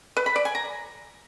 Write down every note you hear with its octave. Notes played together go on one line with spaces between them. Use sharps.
B4
B5
D5
G#5
A#5